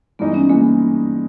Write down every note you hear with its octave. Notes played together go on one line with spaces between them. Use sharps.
G2 E3 G#3 B3 D#4
C#4
E3 G#3 A#3 D#4